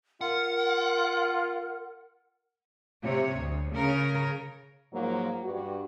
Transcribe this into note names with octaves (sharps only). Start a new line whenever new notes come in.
F4 A#4 F#5
C3 C#5
D2
C#3 A#4 C#5
G#2 F3 F#3 A#3
G2 F#4